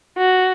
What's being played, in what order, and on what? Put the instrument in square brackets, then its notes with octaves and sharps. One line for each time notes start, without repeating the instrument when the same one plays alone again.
[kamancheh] F#4